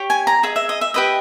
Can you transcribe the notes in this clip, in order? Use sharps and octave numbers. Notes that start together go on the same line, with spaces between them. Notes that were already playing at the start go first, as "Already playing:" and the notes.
Already playing: G4 C#5
G#5
A#5
G#4 D#5 E5
E5
D#5
E5
G4 B4 D#5 E5